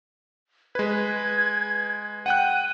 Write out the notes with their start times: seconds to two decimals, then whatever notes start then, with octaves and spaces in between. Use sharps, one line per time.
0.75 G#3 B4 G#6
2.26 F#5 G5 F#6 D#7